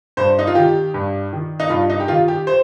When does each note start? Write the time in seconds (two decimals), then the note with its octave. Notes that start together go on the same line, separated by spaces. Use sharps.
0.17 G2 C5
0.39 D#4
0.47 F4
0.55 D#3 G4
0.94 G2
1.33 D#3
1.60 D#4
1.70 G2 F4
1.90 D#4
2.00 G4
2.08 D#3 F4
2.28 G4
2.47 C5